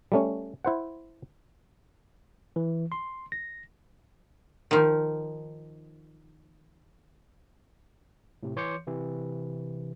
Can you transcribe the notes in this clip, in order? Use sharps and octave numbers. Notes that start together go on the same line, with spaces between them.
G3 A3 C#4
E4 C5 F#5
E3
C6
A#6
D#3 F3
A2 C3
E3 C#5 C6 D6 G6 C#7
C3 E3